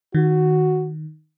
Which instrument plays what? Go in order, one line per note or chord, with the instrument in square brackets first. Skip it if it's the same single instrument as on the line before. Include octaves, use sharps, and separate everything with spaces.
[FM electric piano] D#3 [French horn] F#4